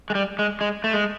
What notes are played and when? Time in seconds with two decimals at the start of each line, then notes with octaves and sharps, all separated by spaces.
0.10 G#3
0.15 G3
0.39 G#3
0.61 G#3
0.84 A3
0.93 G#3